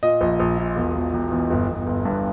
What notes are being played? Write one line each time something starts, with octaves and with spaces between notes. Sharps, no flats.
A#2 D#5
A#1
A#1
A#2
E1
E1
E1
E2
G1
G1
G1
G2